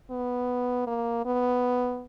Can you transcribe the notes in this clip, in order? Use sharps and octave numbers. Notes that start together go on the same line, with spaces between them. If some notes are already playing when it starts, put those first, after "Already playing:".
B3
A#3
B3